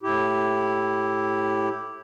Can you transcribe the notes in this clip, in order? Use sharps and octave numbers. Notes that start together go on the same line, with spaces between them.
A2 E4 G4